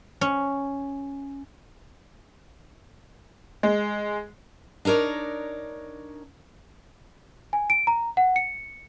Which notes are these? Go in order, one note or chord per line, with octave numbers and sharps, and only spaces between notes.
C#4
G#3
D4 D#4 A#4 C#5 D5
G#5
D7
A#5
F#5
C#7